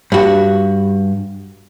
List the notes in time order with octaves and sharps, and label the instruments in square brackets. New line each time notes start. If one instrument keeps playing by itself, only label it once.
[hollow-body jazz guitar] G2 F#4